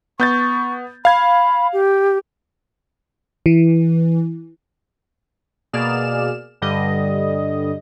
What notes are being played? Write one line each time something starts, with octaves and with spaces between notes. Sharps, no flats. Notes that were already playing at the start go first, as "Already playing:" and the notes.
B3 C#6 G6 A6
F5 B5 G#6
G4
E3
B2 A#3 G#4 D5 F6 E7
G2 D3 G3 D#5